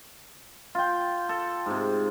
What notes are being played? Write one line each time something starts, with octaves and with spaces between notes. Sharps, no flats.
F4 G5
A4
G#2 C3